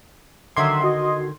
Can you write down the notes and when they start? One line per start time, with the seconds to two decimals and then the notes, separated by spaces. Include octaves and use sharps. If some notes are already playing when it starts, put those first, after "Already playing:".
0.57 D3 D#3 F#3 E5 C6 D6 G#6
0.84 F#4 D#5